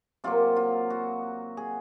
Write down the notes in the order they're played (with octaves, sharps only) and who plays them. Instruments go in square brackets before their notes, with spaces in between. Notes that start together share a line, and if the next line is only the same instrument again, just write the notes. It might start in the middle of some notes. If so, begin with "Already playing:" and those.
[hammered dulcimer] C3 F#3 A#3 F4
F4
F#4
G#4